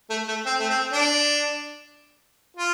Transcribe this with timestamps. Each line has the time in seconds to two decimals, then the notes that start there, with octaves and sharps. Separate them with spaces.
0.10 A3
0.28 A3
0.46 C4
0.59 A3
0.70 C4
0.93 D4
2.57 F4